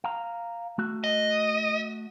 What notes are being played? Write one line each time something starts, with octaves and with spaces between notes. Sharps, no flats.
F5 A#5
A3 F#4
D#5